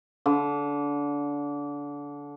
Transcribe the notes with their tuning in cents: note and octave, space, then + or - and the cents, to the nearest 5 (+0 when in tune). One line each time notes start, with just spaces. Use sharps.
D3 -25